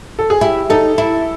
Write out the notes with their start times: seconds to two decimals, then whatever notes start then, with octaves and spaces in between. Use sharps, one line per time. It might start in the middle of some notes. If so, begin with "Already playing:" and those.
0.19 A4
0.30 G#4
0.41 E4 G4
0.70 D#4 A4
0.98 E4